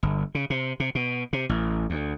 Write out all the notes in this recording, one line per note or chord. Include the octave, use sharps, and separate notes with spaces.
G1
C#3
C3
C3
B2
C3
A1
D2